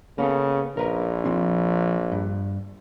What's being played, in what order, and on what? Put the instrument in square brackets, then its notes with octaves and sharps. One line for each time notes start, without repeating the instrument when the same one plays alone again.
[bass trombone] C#3 [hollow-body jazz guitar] A#3 B3 A4
[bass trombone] A#1 [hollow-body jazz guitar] A#4 B4 A#5
[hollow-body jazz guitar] F3 C4 D#4
G2